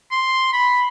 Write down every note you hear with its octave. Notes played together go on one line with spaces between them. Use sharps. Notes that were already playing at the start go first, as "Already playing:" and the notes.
C6
B5